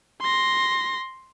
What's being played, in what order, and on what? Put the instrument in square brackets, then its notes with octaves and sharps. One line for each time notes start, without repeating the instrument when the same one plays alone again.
[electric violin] C6 A#6